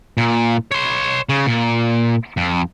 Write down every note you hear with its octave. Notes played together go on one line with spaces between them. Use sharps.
A#2
C#5 C6
C#3
A#2
F2